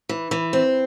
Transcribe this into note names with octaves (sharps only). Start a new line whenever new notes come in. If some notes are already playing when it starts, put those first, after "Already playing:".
E3
E3
C4